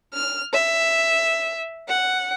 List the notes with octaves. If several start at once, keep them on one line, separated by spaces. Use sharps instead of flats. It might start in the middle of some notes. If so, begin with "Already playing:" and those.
F6
E5
F#5